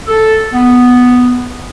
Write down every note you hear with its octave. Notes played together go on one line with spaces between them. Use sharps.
A4
B3